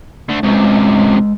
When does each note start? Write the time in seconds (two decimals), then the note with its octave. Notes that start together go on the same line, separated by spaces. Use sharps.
0.29 D3 A3
0.43 C#2 C3 G#3 B4